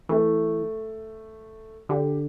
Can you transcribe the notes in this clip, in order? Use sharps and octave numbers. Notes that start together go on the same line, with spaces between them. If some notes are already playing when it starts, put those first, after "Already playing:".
E3 A3
D3 G4